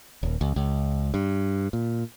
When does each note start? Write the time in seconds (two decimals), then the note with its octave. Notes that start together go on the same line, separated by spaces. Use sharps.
0.23 D#1
0.41 C#2
0.56 C#2
1.14 G2
1.73 A#2